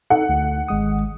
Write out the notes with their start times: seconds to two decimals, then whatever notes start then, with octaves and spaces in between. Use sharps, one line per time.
0.10 D#4 A4 F#5
0.29 D2
0.68 G#1 G#3 D#6